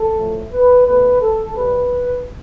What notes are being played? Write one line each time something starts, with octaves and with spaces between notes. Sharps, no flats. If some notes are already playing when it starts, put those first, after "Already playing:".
Already playing: A4
A2 F3 A3
B4
B2 A3 B4
A4
C3 G3 B4